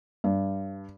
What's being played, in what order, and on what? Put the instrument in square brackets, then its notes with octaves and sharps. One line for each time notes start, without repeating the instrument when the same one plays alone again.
[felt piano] G2